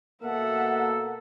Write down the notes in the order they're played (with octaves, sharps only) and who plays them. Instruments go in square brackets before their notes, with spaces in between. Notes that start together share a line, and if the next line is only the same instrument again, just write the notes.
[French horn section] B2 A#3 [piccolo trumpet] A4 [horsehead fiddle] E5 F#5